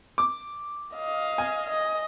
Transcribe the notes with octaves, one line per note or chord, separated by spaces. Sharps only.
D6
D#5 F5
G#5
D#5